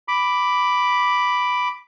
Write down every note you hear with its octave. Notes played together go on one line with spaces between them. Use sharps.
B5 D6